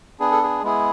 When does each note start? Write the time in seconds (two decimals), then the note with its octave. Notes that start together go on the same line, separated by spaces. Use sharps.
0.20 B3 D4 G#4
0.31 A4
0.43 G#4
0.62 G#3 B3 E4 G#4